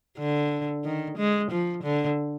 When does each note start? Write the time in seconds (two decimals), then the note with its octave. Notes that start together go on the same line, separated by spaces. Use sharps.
0.18 D3
0.85 D#3
1.18 G#3
1.51 F3
1.84 D3